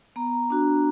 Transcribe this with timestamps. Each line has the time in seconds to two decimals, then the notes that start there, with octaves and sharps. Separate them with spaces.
0.16 B3 A#5
0.50 D4 F#4